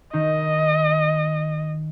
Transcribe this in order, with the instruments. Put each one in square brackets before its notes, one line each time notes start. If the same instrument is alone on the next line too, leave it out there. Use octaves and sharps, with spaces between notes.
[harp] D#3 D#4 [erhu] D#5